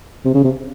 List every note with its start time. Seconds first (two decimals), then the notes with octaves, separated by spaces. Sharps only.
0.25 C3
0.34 C#3
0.45 C3